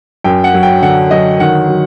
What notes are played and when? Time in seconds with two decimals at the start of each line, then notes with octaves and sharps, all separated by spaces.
0.24 F#2 G5
0.44 F#5
0.54 F#3
0.63 G5
0.82 D3 F#5
1.11 F#3 D#5
1.40 D#3 F#5
1.68 F#3